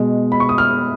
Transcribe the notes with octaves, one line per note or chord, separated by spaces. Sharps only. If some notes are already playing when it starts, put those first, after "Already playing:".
Already playing: B2 G#3
B5
C#6
D#6
F6